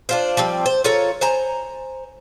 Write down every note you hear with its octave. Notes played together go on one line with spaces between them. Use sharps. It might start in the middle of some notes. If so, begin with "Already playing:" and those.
D4 F4 C5
F3 G3 C4
C5
F4 A4 C#5 A#5
C5 G#5 A#5